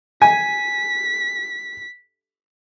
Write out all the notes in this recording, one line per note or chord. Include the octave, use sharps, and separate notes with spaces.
G#5 B6